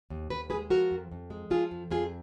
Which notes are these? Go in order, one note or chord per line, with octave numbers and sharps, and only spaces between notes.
D#2
D#2 B4
G#3 G#4 B4
F3 F#4 A#4
F2
F2
G#3
F3 F4 G#4
F2
F2 F4 G#4